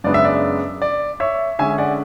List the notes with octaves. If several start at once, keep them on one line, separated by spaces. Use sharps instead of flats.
F#2 C#3 G#3 B3 D4 D5
E5
D5
D5
C#5 E5
D3 G#3 C#4 E5 G#5
D5 F#5